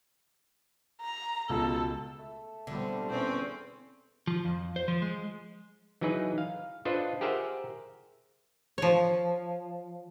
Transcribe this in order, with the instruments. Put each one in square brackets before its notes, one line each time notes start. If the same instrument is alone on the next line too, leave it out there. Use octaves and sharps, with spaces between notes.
[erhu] A#5
[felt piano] C#2 B2 [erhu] A4
[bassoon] A3
[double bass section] B2 G3 C4 [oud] D3
[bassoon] E2 [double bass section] B2 [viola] C4 C#4
[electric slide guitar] F3
F2
C5
F3
G#3
[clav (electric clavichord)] E3 F#3 D#4 G#4 B4
F5
D4 F4 A4 B4 C5 D#5
G4 G#4 A#4 C5 E5 F#5
[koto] F3 C#5